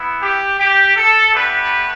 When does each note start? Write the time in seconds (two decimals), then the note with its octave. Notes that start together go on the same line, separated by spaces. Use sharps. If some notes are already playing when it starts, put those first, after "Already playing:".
Already playing: B3 E4
0.21 G4
0.58 G4
0.96 A4
1.32 A3 B3 D4 G4 B4